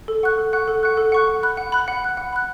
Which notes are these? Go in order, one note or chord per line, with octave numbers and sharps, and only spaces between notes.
A4
F#5 C#6 F#6
A4
F#5 C#6 F#6
A4
F#5 C#6 F#6
A4
F#5 C#6 F#6
F#5
B5 F#6
F#5
B5 F#6
F#5
B5 F#6
F#5
B5 F#6